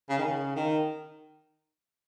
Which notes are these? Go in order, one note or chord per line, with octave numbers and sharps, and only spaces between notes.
C#3
D#3
C#3
D#3